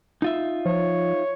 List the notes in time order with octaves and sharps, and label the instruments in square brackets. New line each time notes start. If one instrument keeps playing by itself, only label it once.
[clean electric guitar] D#4 F4 E5
[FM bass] F3 [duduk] C#5